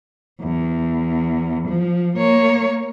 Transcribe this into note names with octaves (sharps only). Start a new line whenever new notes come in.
E2
F3
A#3 C#5